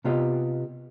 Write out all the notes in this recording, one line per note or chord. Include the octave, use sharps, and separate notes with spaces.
C3 B3 F4 G4 D#5